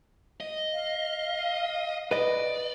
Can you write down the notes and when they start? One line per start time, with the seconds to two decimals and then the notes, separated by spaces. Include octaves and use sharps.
0.40 D#5
0.73 F5
2.11 B4 D5 D#5